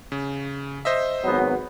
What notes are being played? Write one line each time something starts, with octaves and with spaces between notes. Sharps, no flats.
C#3
C5 D#5 E5
G#1 F#3 B3